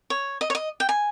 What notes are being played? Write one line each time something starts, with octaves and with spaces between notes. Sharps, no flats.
C#5
D#5
C#5
D#5
G5
G#5